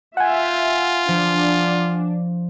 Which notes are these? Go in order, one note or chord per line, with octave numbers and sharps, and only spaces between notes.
F4 E5 F#5 G#5
F3 D4